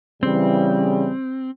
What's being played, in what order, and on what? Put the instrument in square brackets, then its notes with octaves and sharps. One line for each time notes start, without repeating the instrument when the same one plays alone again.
[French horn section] C#3 E3 G3 [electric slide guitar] C4